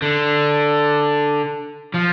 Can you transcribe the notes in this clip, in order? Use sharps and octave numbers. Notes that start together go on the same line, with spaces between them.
D3
F3